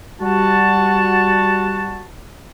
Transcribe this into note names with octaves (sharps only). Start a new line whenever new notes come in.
G3 F#4 A5